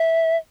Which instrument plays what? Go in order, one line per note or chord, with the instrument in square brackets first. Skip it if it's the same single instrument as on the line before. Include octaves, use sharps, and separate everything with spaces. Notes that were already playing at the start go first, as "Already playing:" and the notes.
Already playing: [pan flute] E5